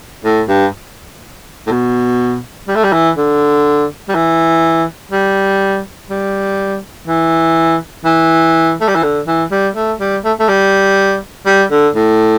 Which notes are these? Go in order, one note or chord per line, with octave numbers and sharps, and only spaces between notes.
A2
G2
A2
B2
G3
A3
G3
E3
D3
G3
E3
G3
G3
E3
E3
A3
G3
E3
D3
E3
G3
A3
G3
A3
A3
G3
G3
D3
A2